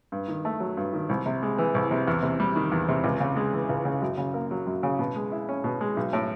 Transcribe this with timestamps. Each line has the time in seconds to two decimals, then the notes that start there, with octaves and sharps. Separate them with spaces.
0.12 G2
0.28 D#3
0.45 A3
0.60 F#3
0.77 G2
0.93 D#3
1.09 C2
1.26 C3
1.43 G#3
1.58 E3
1.74 C2
1.91 C3
2.08 E2
2.23 C3
2.40 G3
2.56 D#3
2.72 E2
2.89 C3
3.04 C#2
3.20 C#3
3.36 G#3
3.53 E3
3.69 C#2
3.85 C#3
4.02 F#2
4.18 C#3
4.34 A#3
4.51 F#3
4.67 F#2
4.83 C#3
4.99 B2
5.16 G#3
5.32 E4
5.49 C#4
5.64 B2
5.81 G#3
5.97 B1
6.13 A2